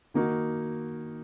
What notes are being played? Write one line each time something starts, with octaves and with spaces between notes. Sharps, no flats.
D#3 A#3 D#4 F#4